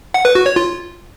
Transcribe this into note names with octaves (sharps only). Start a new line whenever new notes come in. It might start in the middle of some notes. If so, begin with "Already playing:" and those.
F#5
B4
F#4
C#5
F4